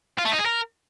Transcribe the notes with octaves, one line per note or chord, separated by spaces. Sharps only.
F4
A3
D#4
G#4
A#4